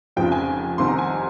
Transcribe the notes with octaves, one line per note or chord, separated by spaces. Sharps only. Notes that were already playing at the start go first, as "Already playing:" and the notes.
F1 F2 C#3 F3 G5
G#5
C2 C3 D#3 C6
A#5
G#5